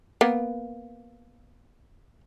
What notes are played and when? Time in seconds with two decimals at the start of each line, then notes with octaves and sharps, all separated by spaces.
0.21 A#3 B3